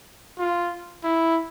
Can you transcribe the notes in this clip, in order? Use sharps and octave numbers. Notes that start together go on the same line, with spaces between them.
F4
E4